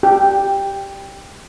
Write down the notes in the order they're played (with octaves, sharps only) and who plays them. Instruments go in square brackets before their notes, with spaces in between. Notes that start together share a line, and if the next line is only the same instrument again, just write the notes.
[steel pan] G4